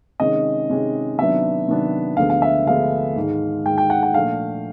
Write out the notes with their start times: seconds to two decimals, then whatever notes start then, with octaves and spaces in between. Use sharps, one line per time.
0.20 C3 D#3 G#3 C#4 D#5
0.70 C3 D#3 G#3 C#4
1.18 C3 D#3 F#3 B3 D4 E5
1.68 C3 D#3 F#3 B3 D4
2.17 D2 D3 F3 G#3 B3 F5
2.30 F5
2.42 E5
2.66 D2 D3 F3 G#3 B3 F5
3.16 G#2 D#3 G#3
3.65 G#2 D#3 G#3 G5
3.78 G5
3.90 F#5
4.03 F#5
4.14 A#2 F3 A3 D4 F5